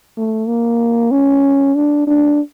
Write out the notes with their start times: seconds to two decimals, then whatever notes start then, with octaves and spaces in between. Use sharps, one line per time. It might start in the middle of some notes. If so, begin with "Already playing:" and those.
0.17 A3
0.48 A#3
1.11 C#4
1.76 D4
2.07 D4